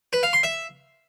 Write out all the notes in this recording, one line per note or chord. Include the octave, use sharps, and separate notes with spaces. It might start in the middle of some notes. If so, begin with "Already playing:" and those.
B4
F5
C6
E5